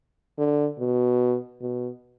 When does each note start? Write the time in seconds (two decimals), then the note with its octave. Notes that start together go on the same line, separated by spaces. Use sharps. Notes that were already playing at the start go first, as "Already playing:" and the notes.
0.39 D3
0.80 B2
1.61 B2